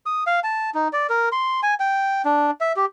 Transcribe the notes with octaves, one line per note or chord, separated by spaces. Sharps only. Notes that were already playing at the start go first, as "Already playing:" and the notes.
D#6
F5
A5
D#4
D5
A#4
C6
G#5
G5
D4
E5
G4